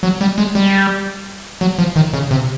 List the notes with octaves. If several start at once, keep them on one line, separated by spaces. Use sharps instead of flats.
F#3
G3
G#3
G3
F#3
F3
D#3
C#3
C3